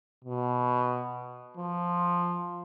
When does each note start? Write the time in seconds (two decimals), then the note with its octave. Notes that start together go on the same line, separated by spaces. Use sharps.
0.24 B2
1.57 F3